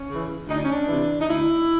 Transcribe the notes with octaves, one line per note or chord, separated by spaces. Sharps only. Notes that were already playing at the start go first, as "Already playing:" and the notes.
Already playing: C#4
C#3 E3
D2 D#4
D4
C#4
D4
C3 E3
D#4
D2 E4